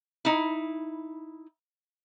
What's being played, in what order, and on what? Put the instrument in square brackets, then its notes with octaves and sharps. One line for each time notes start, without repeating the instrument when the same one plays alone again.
[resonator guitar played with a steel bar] D#4 E4